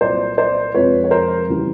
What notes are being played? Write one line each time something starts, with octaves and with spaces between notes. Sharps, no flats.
C2 A#2 F#3 C5 D5
C5 D5
F2 C3 F3 G#3 B4 C#5
C#5
A#4 C5
E2 C#3 E3 G3